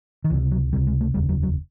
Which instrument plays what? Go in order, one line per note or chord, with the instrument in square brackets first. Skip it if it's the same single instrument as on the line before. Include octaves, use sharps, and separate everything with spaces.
[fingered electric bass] D#3
C#2 C3 E3
F#3
C#2 C3 G3
G#3
A3
F1 D#2 C#3 G3
F#3
F#3